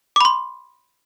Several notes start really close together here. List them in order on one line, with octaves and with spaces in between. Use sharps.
D6 B5 C6